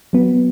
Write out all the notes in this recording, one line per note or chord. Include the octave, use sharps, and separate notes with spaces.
F#3 B3